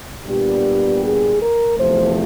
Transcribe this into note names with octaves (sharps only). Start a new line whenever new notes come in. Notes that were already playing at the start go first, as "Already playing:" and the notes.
A#2 G3 B3 D4 G4
G#4
A#4
E2 C3 F3 A3 C5